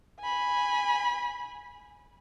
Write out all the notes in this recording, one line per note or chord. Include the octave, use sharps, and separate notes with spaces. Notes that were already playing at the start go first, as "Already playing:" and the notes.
G#5 B5